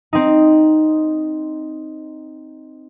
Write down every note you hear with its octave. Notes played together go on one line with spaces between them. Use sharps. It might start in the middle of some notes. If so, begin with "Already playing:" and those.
C4 D#4